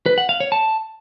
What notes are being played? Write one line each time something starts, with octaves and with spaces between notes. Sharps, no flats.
B4
F#5
F5
C#5
A5